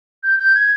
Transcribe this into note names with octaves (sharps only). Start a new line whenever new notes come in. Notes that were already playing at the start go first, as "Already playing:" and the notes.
G6
G6
G#6